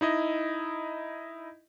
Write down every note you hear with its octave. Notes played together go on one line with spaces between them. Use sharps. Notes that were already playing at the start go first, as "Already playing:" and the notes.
D#4 E4 D#5